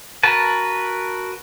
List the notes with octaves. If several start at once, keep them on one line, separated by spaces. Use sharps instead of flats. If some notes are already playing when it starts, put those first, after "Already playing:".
F#4 A#4 B4 A5